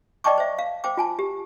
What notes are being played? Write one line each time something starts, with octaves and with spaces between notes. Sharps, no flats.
D5 D#5 G5 A5 C#6 D6
C5 E5
F5
C5 G5 D6
F4 G#5 A5
G4